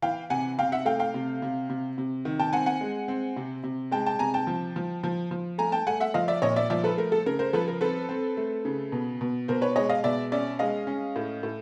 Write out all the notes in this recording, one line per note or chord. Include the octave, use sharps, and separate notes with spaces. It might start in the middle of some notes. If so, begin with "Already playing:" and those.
E3 F5 G5
C3 F#5 G#5
C3 F5 G5
E5 F#5
A3 F5 G5
F5 G5
C3
C3
C3
C3
D#3
G5 A5
C4 F#5 G#5
F#5 G#5
G#3
C4
C3
C3
G#3 G5 A5
G5 A5
C3 G#5 A#5
G5 A5
F3
F3
F3
F3
A3 G#5 A#5
G5 A5
A3 F#5 G#5
E5 F#5
F3 D#5 F5
D5 E5
A#2 C#5 D#5
D5 E5
F3 D5 E5
A4 B4
A3 A#4
A4
C#3 A#4
A#4 C5
F3 A4 B4
A#4
C4 A4 B4
C4
A3
C#3
B2
B2
B2 A#4 C5
B4 C#5
G#3 C#5 D#5
D#5 F5
B2 D5 E5
C#4 D5 E5
G#3 D#5 F5
C#4
A2
A2